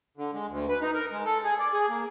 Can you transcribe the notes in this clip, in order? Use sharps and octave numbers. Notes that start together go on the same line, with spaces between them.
D3
G#3
D2
B4
D#4
A#4
G#3
A4
G#4
D5
G#4
A#3